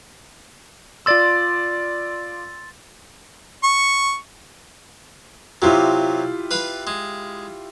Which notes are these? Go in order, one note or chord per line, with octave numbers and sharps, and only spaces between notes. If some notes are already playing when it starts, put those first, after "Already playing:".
F4 D5 C6 E6 A6
C#6
C3 F#3 E4 F4 G4
B4 F5 B5
G#3